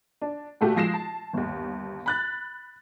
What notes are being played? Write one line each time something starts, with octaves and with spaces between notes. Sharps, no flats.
D4
A#2 A3 F#4 G4
F3 G#3 A#6 C7 E7
A5
G1 D#2
B5 F#6 A6